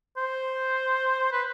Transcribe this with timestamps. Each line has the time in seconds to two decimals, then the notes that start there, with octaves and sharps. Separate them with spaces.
0.17 C5
1.32 B4